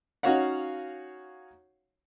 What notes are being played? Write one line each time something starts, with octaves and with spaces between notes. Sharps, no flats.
C#4 D#4 F#4 C#5 F5 F#5